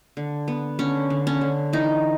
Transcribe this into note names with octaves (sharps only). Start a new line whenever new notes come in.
D3
B3
D3 C#4
D3
C#4
D3
E3 D#4